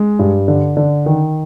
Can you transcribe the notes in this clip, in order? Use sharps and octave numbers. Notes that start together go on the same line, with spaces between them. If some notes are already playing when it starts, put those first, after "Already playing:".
Already playing: G#3
G2
D3
D3
D#3